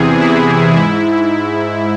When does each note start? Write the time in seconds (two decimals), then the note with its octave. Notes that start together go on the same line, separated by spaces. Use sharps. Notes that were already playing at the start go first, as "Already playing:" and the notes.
Already playing: E2 C3 E3 G#4
0.19 E4
0.75 G#2 E4